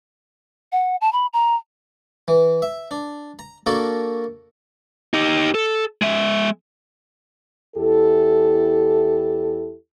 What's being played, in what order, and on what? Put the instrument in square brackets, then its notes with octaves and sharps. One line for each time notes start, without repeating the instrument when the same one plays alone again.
[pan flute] F#5
A5
B5
A#5
[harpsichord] E3
E5
D4
A#5
A#3 D4 F#4 A4 A#4
[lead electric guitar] D#4 G4
A4
G#3 E5
[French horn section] E2 E4 G4 A4